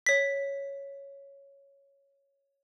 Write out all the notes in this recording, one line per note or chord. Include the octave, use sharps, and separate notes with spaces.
C#5 B6